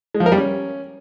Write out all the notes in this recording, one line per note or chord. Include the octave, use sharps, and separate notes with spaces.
G#3
F3
A#4
G3
C#4